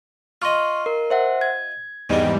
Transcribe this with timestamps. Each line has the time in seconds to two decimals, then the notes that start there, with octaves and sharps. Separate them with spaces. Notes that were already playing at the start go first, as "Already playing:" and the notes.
0.42 F4 D#5 C6 C#6 F6
0.86 A#4
1.10 C5 E5 F#5
1.41 G#6
2.09 E2 G#2 D#3 G3 G#3 C4